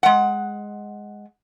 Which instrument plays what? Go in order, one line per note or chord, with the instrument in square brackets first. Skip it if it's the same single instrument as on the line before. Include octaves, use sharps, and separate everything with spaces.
[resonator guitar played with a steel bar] G#3 F#5